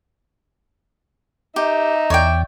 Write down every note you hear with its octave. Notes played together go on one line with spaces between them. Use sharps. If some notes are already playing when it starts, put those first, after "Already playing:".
D#4 G4 E5
E2 C#5 D5 G5